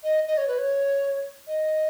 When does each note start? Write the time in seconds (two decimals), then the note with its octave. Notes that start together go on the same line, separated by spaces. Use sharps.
0.03 D#5
0.27 D#5
0.38 C#5
0.48 B4
0.58 C#5
1.47 D#5